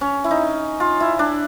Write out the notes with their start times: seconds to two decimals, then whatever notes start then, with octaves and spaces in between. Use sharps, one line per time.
0.01 C#4
0.24 E4
0.31 D#4
0.80 F4
1.00 E4
1.19 D4